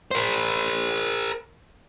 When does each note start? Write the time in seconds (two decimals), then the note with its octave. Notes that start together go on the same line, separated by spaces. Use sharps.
0.11 A#4 C5